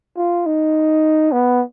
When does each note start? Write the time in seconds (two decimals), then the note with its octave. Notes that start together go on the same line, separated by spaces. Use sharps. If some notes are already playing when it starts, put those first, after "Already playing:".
0.17 F4
0.46 D#4
1.32 B3